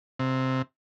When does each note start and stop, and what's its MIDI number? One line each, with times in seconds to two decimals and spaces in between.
0.19 0.62 48